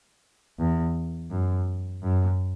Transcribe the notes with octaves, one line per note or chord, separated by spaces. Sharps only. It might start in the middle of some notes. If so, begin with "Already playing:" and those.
E2
F#2
F#2